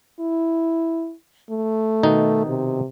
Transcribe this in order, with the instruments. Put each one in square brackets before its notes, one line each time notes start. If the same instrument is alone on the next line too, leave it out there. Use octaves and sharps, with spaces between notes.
[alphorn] E4
A3
[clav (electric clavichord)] B2 D#3 D#4
[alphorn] C3